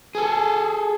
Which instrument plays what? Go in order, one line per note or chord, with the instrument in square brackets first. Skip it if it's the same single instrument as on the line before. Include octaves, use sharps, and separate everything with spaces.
[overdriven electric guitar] G#4 A4